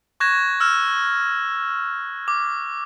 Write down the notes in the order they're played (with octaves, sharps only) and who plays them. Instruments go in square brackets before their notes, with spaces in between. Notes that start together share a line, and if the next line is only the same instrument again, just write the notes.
[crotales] C#6 F#6 G#6 A#6 E7
E6 F6 E7
D6